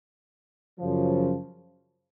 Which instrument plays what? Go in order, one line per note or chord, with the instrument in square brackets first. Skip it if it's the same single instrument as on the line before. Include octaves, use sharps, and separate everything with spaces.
[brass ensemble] F#2 C#3 F3